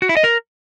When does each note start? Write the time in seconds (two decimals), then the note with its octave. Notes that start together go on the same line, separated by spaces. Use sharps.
0.02 F#4
0.09 E4
0.17 D#5
0.24 A#4